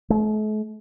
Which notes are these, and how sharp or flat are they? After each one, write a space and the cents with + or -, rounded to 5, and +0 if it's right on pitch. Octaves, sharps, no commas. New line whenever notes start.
A3 -45